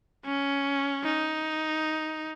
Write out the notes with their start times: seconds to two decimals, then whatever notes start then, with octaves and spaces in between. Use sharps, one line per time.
0.25 C#4
1.03 D#4